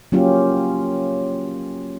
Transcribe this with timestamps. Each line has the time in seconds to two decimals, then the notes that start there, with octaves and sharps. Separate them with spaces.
0.12 F#3 A#3 C#4 F4 G4